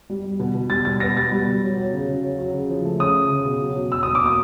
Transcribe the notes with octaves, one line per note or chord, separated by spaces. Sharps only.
G3
G3
B2
B2
G3 A6
B2 A6
B3 A#6
G3 A6
G3
B2
F#3
F#3
C#3
C#3
F#3
F#3
C#3
F3
A3
C#3 D#6
C#3
C#3
B2
F#3
F#3
F#3 E6
B2 D#6
D6
A#3 D#6